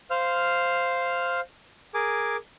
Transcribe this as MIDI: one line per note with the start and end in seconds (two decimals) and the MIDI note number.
0.10 1.40 72
0.10 1.40 77
0.10 1.40 89
1.94 2.37 68
1.94 2.37 70
1.94 2.37 80
1.94 2.37 86